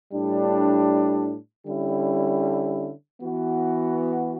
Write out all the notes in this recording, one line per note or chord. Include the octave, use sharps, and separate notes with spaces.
A2 G3 D4
D3 G3 C#4 E4
E3 B3 F#4